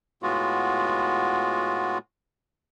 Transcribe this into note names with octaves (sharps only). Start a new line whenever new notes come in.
A2 G#3 B3 F4 F#4